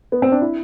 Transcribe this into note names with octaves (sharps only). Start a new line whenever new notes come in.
B3
C4
D4
E4